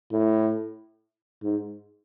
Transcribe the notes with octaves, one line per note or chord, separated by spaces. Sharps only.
A2
G#2